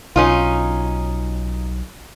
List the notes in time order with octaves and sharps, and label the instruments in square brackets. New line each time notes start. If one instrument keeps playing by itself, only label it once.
[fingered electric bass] B1 [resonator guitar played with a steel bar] C#4 D#4 F4